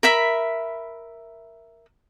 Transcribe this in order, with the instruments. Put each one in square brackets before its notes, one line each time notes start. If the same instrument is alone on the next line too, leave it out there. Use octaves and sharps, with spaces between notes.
[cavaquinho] A#4 E5 B5